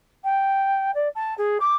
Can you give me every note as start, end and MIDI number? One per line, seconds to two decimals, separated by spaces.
0.24 0.91 79
0.94 1.08 74
1.15 1.34 81
1.38 1.58 68
1.60 1.75 86